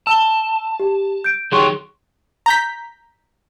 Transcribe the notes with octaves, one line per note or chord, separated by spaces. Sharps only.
A5 E6 G7
G4
G6 D7
D#3 F#3 G4 G#4 C6 C#6
A#5 G6 B6